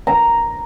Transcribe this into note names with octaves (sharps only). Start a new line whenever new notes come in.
A#5